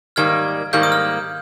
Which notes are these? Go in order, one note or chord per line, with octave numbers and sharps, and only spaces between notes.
G#2 D#3 G3 A#3 F6 G#6
G#2 D#3 G3 A#3 G6
D#6
F6